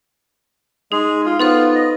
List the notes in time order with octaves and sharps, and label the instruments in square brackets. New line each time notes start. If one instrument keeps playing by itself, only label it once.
[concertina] G#3 G#4 [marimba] D#4
[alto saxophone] F4
[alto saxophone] B3 [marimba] D#4 A4 C5 [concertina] F4
[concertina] D#5